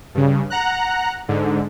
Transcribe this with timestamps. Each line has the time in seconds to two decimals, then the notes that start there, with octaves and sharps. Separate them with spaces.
0.15 G2 C#3
0.50 F#5 A#5 F#6
1.28 G#2 D3